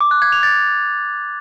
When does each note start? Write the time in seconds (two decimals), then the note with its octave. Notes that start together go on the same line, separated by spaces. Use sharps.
0.01 D6
0.11 F#6
0.22 G#6
0.32 F7
0.43 A6